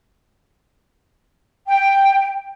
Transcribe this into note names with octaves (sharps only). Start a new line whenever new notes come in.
G5